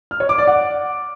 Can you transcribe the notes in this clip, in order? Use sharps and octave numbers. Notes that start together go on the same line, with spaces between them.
F6
C#5
D6
D5
F#5